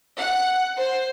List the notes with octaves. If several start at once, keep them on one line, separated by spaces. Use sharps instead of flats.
F#5
C5